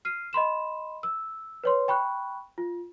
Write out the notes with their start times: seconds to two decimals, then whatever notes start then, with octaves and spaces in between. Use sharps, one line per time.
0.05 F6 C7 D#7
0.33 D#5 B5 C6 E7
1.03 E6
1.64 B4 C#5 C6
1.88 G5 B5 C#6 F#6
2.58 F4